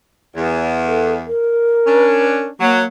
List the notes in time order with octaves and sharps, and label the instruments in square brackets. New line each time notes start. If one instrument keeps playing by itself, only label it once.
[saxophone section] E2
[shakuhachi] A4
A#4
[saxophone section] C#4 D4
[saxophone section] F#3 [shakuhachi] A#3